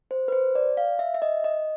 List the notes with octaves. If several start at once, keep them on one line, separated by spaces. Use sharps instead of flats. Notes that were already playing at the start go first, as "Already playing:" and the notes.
C5
B4
C5
D5
F5
E5
E5
D#5
D#5